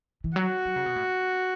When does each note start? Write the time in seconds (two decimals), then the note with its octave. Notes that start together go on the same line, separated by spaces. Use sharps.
0.24 E3
0.36 F#3 F#4
0.66 F#3
0.76 C#3
0.86 B2
0.96 A2